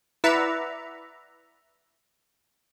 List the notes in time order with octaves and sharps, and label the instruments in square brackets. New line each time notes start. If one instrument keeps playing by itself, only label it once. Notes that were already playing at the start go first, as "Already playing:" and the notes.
[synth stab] E4 B4 D5 E5 F#5 A#5